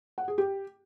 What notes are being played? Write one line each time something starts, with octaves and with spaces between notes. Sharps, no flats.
F#5
G#4
G4